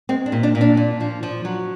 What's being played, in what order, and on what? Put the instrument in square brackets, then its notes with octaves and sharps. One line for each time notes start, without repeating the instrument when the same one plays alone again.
[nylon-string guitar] G#3 C4
D4
A#2
D4
A#2
D4
A#2
F3
F3
F#3